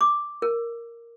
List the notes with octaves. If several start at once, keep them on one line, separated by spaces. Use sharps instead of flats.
D6
A#4